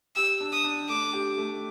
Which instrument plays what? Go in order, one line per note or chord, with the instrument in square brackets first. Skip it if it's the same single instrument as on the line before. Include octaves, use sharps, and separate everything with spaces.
[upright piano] G4 [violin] E6
[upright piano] D4
[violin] D#6
[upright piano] D4
[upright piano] A3 [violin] D6
[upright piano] G4
A3